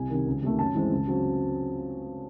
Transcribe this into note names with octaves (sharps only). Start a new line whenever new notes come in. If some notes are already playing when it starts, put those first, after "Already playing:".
Already playing: C2 G#5
C3 D#3
C#2
C3 D#3 A3
F#2 A5
E3 G#3 C4
C#2
C#3 F#3 C4